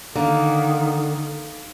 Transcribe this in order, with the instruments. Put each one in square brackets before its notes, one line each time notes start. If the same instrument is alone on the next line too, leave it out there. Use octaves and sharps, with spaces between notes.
[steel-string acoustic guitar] D3 [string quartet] D#3 [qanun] A#3